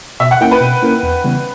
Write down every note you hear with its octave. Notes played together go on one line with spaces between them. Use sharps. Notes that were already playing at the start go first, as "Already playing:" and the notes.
B2 E5
F#5
A#3 C#4 E4 A#4 G5
B4
B2
A#3 C#4 E4 A#4
E2
C#3 E3 G3 B3